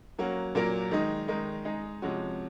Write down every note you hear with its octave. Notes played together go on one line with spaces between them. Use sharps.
F#3 A#3 C#4 F#4
A#2 F#3 A#3 F4 A#4
D#3 G#3 D#4
D#3 G#3 D#4 A#4
G#3 D#4 G#4
C3 F3 G#3 C#4 F#4